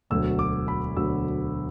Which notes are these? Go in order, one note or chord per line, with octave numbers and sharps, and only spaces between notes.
E1 D2 D3 F#3 E6
D6
B5
E1 D2 D3 F#3 E6